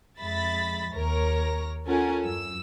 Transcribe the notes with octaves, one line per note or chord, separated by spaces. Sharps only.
F2 G#3 E5 B5 A6 B6
D#2 A#4 C#5 A#6
C#4 F4 A4 A#4 F#5 G#5
F#2 E6